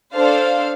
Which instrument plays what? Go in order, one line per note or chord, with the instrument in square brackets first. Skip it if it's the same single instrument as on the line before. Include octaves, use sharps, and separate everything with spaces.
[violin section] D4 A4 C5 F5